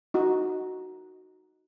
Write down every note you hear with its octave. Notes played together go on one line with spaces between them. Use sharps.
D#4 F#4